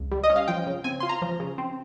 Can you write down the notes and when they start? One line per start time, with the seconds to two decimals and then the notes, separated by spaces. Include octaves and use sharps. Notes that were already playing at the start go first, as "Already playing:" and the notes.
Already playing: C#2
0.11 G3
0.24 D#5
0.30 C#4
0.36 F5
0.48 F3 G5
0.66 C#3
0.84 C4 G#5
1.00 F4 C6
1.09 A#5
1.22 F3
1.40 C#3
1.58 C4